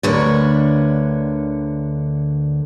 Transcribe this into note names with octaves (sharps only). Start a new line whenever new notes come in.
D2 D3 A#4 B4 C#5